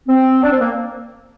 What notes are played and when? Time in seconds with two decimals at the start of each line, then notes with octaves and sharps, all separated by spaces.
0.08 C4
0.43 D4
0.52 C4
0.61 A#3